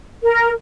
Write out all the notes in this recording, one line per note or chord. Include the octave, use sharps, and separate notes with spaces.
A#4